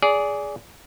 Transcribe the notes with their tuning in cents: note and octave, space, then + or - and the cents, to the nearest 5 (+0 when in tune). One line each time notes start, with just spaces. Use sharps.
G#4 +0 D5 -25